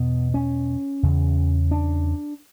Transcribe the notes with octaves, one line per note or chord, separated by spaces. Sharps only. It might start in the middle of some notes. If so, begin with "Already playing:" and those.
Already playing: E2 B2 B3
C#4
E2 C#3
D4